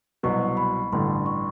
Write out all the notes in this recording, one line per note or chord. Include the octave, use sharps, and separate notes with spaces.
C2 B2 F#3 C#6
B5
A1 G2 D3 C6
C#6